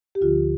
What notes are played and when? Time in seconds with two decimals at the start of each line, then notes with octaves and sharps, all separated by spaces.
0.15 G4
0.21 D2 D3 F3 F4